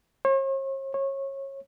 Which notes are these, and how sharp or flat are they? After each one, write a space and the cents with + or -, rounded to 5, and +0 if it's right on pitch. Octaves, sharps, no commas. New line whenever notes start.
C#5 -45
C#5 -25